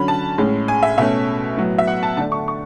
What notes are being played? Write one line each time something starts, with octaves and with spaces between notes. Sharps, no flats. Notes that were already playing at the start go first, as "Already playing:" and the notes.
Already playing: D3 F#3 C#4 B5
A5
A2 G#3 C#4
G#5
E5
B2 A3 C#4 E5
A2 F#3 B3
E5
F#5
A5
D3 A3 D4 A5
C#6
C#6